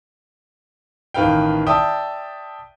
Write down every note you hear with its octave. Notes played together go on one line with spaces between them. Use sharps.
A1 D#3 B4 F5 G5
D5 E5 G5 A5 D#6